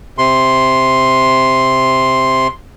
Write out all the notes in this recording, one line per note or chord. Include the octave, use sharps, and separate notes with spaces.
C3 C6